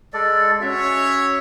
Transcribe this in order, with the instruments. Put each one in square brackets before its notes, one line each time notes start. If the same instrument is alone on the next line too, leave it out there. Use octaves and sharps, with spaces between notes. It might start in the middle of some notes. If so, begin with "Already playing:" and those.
[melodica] G#3 A4 D5
[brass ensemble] C#4 F#4 C#5 [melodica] E5